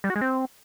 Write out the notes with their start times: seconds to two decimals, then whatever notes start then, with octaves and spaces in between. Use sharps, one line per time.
0.04 G3
0.10 F#4
0.16 G#3
0.21 C4